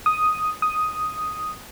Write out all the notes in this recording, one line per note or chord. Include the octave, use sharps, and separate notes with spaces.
D#6
D#6